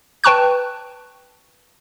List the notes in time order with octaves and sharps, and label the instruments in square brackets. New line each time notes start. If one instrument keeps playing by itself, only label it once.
[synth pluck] B4 G5 A5 C#6 F#6